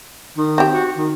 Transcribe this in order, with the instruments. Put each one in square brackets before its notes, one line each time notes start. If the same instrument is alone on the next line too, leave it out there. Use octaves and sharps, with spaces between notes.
[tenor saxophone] D#3
[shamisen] C4 G4
[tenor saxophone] F#4
D#3